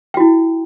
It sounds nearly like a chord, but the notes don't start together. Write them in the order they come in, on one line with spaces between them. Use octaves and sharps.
G5 F#4 E4